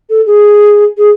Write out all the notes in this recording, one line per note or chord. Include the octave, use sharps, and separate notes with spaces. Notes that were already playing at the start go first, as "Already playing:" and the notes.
A4
G#4
G#4